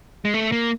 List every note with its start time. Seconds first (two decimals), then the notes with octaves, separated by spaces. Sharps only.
0.25 G#3
0.34 A3
0.52 A#3